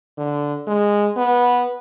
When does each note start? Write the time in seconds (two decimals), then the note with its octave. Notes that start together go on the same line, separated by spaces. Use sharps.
0.18 D3
0.67 G#3
1.16 B3